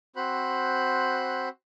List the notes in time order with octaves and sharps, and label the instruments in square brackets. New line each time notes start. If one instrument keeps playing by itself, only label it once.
[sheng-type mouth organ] C4 F#4 C5 B5 F#6